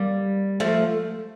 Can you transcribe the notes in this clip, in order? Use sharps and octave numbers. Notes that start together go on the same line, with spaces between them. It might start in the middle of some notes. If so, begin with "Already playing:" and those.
Already playing: G3 A#3
F3 A3